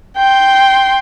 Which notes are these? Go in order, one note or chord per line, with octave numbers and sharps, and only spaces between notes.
G5 C6